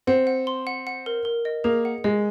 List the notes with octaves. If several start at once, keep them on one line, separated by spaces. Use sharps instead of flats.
C4 F#5
F#5
C6
F#5
F#5
A#4
A#4
D#5
A#3 G#4
F#5
G#3 D#5